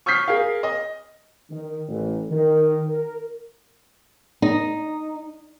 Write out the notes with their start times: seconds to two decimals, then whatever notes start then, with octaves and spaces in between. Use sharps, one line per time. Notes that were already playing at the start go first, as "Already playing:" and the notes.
0.06 C#6 D#6 F6 G6 B6 C7
0.28 G#4 A#4 F5
0.63 D#5
1.51 D#3
1.88 A1
2.31 D#3
2.87 A#4
4.42 D#4